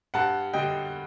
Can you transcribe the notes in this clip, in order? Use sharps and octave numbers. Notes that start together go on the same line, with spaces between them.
G2 F#5 A5
D3 G3 D#5 G5